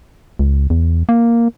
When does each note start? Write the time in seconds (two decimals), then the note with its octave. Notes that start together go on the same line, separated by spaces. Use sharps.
0.39 C#2
0.70 E2
1.09 A#3